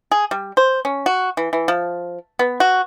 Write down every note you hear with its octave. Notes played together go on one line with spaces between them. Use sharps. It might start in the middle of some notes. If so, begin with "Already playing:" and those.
G#4
G3
C5
C#4
F#4
E3
E3
F3
B3
F#4